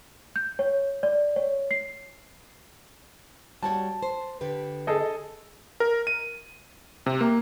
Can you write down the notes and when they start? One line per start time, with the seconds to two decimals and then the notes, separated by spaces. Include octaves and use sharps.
0.36 G6
0.59 C#5
1.03 D5
1.36 C#5
1.71 C7
3.63 G3 F#4 C#5 A5
4.03 C5
4.41 D3 G4 B4
4.87 G#4 A4 D#5
5.80 A#4
6.07 D#7
7.06 C3
7.21 A#3